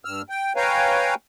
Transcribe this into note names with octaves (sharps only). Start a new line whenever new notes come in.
G2 E6 F6
G5
B4 C#5 F5 G5 G#5 A#5